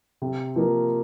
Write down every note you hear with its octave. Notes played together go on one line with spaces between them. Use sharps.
C3
F3 A#3